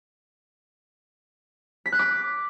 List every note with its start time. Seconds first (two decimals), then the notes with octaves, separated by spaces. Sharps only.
1.86 B6
1.92 F#6
1.99 D6